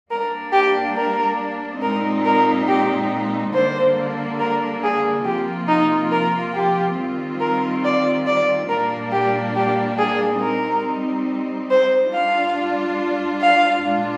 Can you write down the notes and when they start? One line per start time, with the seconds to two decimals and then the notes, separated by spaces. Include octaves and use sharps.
0.10 G3 A#3 D4 A#4
0.53 G4
0.97 A#4
1.82 A#2 G#3 C4 D#4 A#4
2.25 A#4
2.68 G4
3.54 D3 G3 A#3 D4 C5
4.40 A#4
4.84 G#4
5.25 C3 F3 A#3 F4 G4
5.69 D#4
6.12 A#4
6.54 G4
6.98 D#3 G3 C4 F4
7.41 A#4
7.84 D5
8.27 D5
8.70 A#2 G3 A#3 D4 A#4
9.12 G4
9.56 G4
9.99 G#4
10.41 G3 C4 D#4 A#4
11.71 C5
12.14 G3 D4 F4 F5
13.42 F5
13.85 A#2 G#3 D4 F4